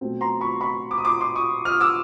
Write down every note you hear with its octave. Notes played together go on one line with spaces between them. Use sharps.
B2 F#3 A3 C4
A#5 C6
B5 C#6
B5 C#6
D6
D#6
C6 D6
C6 D6
C#6 D#6
D#6 F6
D6 E6